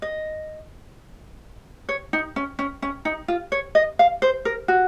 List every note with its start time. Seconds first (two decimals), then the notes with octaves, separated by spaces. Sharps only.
0.02 D#5
1.89 C#5
2.13 D#4
2.36 C#4
2.59 C#4
2.82 C#4
3.05 D#4
3.28 F4
3.52 C#5
3.75 D#5
3.99 F5
4.22 C5
4.45 A#4
4.68 F#4